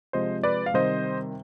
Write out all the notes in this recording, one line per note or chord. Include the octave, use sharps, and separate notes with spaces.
C3 F3 G#3 C5 D#5
B4 D5
F5
C3 D#3 G3 C5 D#5